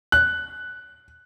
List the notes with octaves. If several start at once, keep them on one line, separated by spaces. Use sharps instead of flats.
F#6